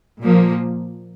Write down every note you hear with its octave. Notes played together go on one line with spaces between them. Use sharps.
A#2 F3 A#3